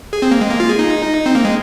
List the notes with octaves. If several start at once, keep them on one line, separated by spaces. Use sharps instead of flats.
G#4
C4
A#3
G#3
A#3
F4
G#4
D#4
C4
A#3
G#3